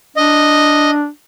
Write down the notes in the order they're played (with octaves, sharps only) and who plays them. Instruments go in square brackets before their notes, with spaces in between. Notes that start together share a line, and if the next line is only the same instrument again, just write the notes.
[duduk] D4 [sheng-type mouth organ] D#5